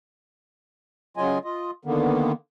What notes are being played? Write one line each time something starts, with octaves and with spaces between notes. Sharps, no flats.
C#3 F#3 F4 D#5 G#5
F4 D#5
D3 D#3 A#3 B3